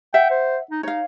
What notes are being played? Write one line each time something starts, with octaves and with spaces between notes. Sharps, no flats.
E5 F#5 G5
C5
D#4
D#4 C#5 F5